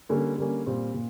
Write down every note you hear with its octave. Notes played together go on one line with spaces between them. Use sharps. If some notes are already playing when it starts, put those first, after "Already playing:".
D3 G3 A#3 C#4
D3 G3 A#3 C#4
A#2 G3 C4
A#2